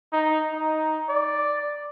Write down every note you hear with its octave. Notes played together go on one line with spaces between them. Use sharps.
D#4
D#4
D5